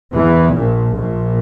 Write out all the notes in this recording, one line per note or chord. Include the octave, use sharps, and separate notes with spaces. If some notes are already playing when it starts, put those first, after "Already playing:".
E2 E3
A#1 A#2
A#1 A#2